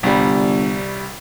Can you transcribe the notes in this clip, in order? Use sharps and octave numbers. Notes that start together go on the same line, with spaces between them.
G1 C2 G3